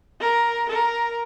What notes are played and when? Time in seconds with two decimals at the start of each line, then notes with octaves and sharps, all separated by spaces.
0.21 A#4
0.69 A#4